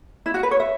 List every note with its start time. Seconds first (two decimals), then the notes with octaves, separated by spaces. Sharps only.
0.26 E4
0.34 F#4
0.43 B4
0.51 C#5
0.60 E5